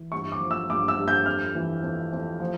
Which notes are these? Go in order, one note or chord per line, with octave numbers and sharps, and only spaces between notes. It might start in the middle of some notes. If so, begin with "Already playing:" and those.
Already playing: E3
G2 C#6
D6
F3
E6
G2 D6
E6
G2
G6
F2 F6
E3
F2
F2
F3